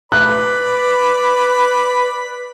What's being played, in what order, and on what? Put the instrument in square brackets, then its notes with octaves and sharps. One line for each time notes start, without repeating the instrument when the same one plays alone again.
[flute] B4 [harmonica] D5 B5 [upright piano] F#6